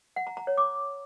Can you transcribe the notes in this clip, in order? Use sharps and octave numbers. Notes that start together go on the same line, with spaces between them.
F#5
A#5
A#5
C#5
D6